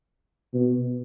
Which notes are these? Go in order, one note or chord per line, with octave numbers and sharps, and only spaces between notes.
B2